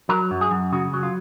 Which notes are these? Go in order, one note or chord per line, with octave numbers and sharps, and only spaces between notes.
F#3 A#4
F#2
G#4
F#2
C#3 F#4
F#3
F4